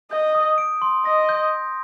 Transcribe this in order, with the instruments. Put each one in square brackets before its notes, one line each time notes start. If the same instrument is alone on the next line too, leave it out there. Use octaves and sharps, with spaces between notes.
[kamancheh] D#5 [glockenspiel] G6
[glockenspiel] D#6
D7
C6
[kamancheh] D#5 [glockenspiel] A#6
[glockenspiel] G6